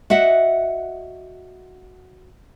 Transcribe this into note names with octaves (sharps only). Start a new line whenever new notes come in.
F#4 D#5 E5 F#5